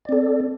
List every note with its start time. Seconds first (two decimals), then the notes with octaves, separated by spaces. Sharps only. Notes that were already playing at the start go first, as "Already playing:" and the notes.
0.05 D5
0.09 C4
0.12 A4